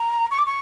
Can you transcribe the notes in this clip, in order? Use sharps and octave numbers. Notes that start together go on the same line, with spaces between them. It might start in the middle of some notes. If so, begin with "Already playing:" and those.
Already playing: A#5
C#6
D6
C#6